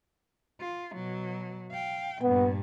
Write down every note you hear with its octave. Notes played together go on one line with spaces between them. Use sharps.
F4
B2 F#3
F5 G5
G2 A#2 B3